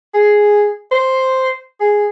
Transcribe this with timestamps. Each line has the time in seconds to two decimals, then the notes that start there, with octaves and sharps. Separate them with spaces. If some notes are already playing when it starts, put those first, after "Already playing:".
0.14 G#4
0.91 C5
1.80 G#4